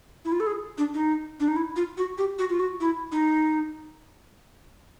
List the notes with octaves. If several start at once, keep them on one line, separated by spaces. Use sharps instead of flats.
E4
F4
A4
G#4
D4
D#4
D4
D#4
E4
F4
F#4
G4
F#4
F4
F#4
E4
D#4